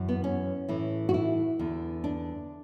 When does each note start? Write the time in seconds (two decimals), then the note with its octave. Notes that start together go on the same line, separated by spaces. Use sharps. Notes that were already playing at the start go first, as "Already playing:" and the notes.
Already playing: F#2 E3
0.09 B3
0.24 C#4
0.69 A2 E3
1.09 F#4
1.14 E4
1.59 E2 D3
2.04 D4